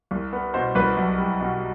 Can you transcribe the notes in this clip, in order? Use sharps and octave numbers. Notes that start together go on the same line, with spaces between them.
C2
B3
B2 C5
C2 B4
B1
G3
B2